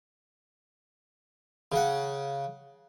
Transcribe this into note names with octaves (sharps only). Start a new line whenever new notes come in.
C#3 F#5